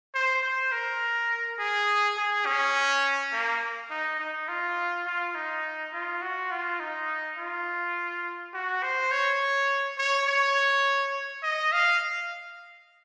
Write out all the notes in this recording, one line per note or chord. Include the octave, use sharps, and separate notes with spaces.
C5
C5
A#4
G#4
G#4
C#4
A#3
D#4
D#4
F4
F4
D#4
F4
F#4
F4
D#4
F4
F#4
C5
C#5
C#5
C#5
D#5
F5